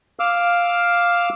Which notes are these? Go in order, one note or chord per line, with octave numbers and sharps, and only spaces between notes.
F5 D6 E6 F6